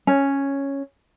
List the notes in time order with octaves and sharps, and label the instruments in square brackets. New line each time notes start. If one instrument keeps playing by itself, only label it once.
[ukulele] C#4